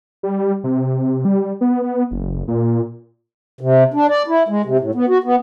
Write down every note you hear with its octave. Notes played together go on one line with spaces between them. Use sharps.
G3
C3
G3
B3
B3
F#1
A#2
C3
D4
D5
E4
G#3
C3
A2
B3
F#4
B3